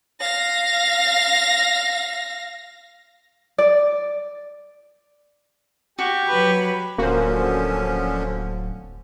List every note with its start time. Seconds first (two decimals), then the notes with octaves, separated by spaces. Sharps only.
0.21 F5 A#6
3.58 D5
5.99 F#4 G4 C#6
6.28 F#3 B4
6.98 D1 D3 F3 A#3 C#4 F#4 C5